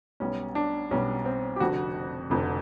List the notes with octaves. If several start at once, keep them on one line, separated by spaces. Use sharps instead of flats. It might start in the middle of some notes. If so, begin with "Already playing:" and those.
B1 B2 G3 C#4
D4
B1 B2 G3 C#4
C4
G4
F1 F2 D3 F#4
F1 F2 D3